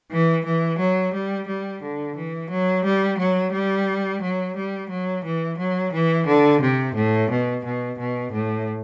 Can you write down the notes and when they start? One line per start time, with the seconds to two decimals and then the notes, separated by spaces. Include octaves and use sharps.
0.12 E3
0.45 E3
0.79 F#3
1.14 G3
1.48 G3
1.83 D3
2.16 E3
2.50 F#3
2.85 G3
3.19 F#3
3.53 G3
4.22 F#3
4.56 G3
4.90 F#3
5.25 E3
5.58 F#3
5.93 E3
6.27 D3
6.61 C3
6.96 A2
7.31 B2
7.65 B2
7.99 B2
8.33 A2